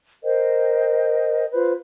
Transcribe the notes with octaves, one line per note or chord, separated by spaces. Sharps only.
A#4 C5 D#5 G5
F4 B4 C5